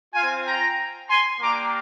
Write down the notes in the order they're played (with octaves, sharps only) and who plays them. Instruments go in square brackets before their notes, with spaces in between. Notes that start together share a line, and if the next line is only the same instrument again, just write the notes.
[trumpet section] F4 F5 G#5
C4
G5 A#5
G#5 C6
A#3 D4 G4 A#5 D6